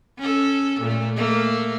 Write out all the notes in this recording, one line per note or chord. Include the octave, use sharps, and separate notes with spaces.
C#4 A4
A#2 A3
A3 A#3